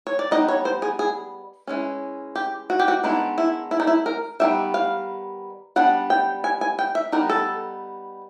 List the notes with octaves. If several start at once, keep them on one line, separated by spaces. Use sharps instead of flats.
C#5
D5
G3 B3 D#4 D#5
C#5
C5
G#4
G#4
E3 G#3 C#4
G4
F#4
G4
F#4
D#3 G#3 B3 D4 E4
E4
E4
D#4
E4
A#4
D#3 G3 B3 D#4 E5
F5
G3 B3 D4 F#5
G5
G#5
G#5
G5
E5
G3 B3 D#4 A#4
A4